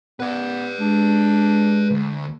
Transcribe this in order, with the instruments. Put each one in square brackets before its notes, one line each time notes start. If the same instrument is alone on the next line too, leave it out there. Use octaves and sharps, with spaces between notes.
[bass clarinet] B3 [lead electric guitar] B4 D5
[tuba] G#3 [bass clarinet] D4
[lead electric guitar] D2